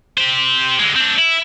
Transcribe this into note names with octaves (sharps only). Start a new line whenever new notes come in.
G4 C5
D3 G#3
C4 D4
E4